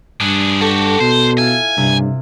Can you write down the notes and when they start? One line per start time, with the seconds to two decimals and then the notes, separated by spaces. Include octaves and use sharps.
0.21 G2 D4 G#4 F#6 C#7
0.61 F#4 G4 A4
1.00 B2 C5
1.38 E4 F4 G#5
1.77 G2 C3